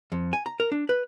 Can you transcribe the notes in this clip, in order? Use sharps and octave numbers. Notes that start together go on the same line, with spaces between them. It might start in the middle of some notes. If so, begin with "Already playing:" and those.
F2
G#5
A#5
A#4
D4
B4